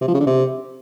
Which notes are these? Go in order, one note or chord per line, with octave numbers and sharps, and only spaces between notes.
C3
F3
C#3
D3
C3